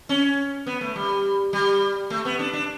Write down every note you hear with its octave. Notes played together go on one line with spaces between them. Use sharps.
C#4
B3
A3
G3
G3
A3
B3
D4
D4